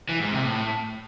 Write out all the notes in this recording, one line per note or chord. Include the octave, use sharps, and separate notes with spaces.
E3
G#2
C3
A2